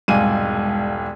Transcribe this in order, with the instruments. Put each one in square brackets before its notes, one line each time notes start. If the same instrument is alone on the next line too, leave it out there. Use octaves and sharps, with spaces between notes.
[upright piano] E1 C2 G#2 F5 G#5 D#7